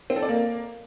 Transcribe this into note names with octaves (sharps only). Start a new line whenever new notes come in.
C4
A4
D5
A#3